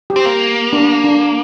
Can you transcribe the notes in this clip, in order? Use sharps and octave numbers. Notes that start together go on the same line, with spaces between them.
G4
C4
A#3
D4
D4